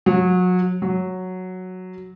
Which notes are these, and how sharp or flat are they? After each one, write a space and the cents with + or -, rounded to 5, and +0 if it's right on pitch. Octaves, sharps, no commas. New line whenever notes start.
F#3 -30
F#3 -5